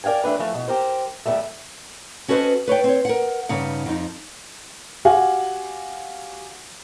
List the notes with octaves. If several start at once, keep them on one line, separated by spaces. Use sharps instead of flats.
A#4 D5 F5 G5 G#5
E3 A3 D4 B4
E3 F3 A3
B2
G4 A#4 C5
D#2 A2 C#3 F#3 G3 A3
C#4 F#4 A4 B4 C5 D#5
B4 C#5 D5 G5
C4 C#5
A#4 F#5
G2 C#3 D#4 F#5
F2 D#4
F#4 G4 F5 F#5 G#5